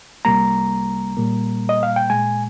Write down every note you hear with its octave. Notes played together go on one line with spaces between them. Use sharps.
C2 C3 G3 A#3 A#5
A#2 G3 A#3
D#5
F5
G5
A#2 G#3 G#5